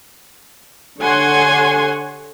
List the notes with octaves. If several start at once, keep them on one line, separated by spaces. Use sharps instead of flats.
D3 G4 C#5 F#5 G#5 C6